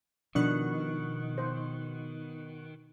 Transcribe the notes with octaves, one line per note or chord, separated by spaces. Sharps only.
B2 D#3 F3 D4 C#6 F#6
C5